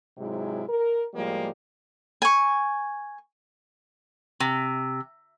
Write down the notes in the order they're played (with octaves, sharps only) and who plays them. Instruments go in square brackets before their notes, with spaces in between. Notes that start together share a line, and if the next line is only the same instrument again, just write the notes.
[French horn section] G#2 C3 F#3 G#3 E4
A#4
A2 F3 G3 G#3 A#3
[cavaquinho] G#5 C#6
[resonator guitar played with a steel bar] C3